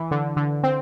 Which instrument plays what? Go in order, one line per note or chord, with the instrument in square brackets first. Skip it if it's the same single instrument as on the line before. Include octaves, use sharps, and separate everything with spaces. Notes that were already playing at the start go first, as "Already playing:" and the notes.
Already playing: [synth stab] E3
D3
D3
C4